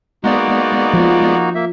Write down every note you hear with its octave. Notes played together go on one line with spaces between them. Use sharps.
G#3 A#3 B3 D#4 F#4 D5
F3
A#3 E5